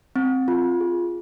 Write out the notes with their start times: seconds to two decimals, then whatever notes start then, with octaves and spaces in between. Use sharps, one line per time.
0.16 C4
0.48 F4
0.80 G#4